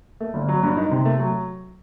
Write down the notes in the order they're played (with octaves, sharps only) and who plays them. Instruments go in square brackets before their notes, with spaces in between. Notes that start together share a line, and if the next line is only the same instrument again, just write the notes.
[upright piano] A3
G1
F#3
G2
D#4
C3
A3
F#3